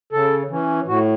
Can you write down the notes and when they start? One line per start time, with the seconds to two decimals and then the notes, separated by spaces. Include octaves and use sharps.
0.13 C#3 A4
0.50 E3 C#4
0.88 A2 F#4